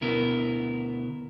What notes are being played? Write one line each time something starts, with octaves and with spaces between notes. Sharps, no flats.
D2 B2 B3 E4 A#4